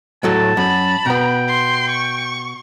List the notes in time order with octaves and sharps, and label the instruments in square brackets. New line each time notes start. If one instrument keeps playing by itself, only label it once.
[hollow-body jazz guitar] A2 F#3 A3 [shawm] A5
[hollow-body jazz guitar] F#2 [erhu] B5
[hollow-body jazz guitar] B2 B3 [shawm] G5
[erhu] C6
C#6